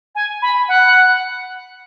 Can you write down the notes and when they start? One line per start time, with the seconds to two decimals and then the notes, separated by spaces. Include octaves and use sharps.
0.15 G#5
0.42 B5
0.68 F#5